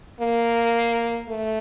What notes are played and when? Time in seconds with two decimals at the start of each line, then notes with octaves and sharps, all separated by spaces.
0.21 A#3
1.30 A3